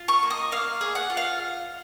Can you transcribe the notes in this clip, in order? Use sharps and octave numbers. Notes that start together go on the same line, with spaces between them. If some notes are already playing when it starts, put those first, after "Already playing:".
Already playing: F4
C#6
A#3
D#5
A#3 F5
G#4
F#5
F4
F5